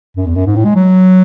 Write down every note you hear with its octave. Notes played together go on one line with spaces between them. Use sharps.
F#2
E2
F#2
G#2
A2
G#3
F#3